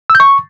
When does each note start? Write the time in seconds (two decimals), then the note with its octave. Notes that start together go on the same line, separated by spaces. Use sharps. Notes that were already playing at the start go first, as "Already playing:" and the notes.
0.10 E6
0.15 G6
0.20 C#6